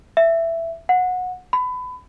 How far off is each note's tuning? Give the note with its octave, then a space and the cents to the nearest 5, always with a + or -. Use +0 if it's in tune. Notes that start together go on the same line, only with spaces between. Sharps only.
E5 +10
F#5 -20
B5 +25